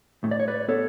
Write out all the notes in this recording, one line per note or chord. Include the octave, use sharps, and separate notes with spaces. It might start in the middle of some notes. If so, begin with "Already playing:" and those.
A2
D5
C#5
B4 D5
B3 A4 C#5